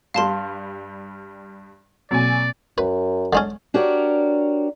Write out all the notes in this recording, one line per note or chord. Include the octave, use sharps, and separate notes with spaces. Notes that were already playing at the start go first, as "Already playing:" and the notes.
G2 G3 F5 A5 C6
B2 F#3 A#3 C4 D5 G#5
F#2 B4
D3 G#3 C#4
D4 F#4 G4 A#4 C#5 D5